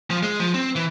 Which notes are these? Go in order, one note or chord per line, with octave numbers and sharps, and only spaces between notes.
F3
G#3
F3
C4
E3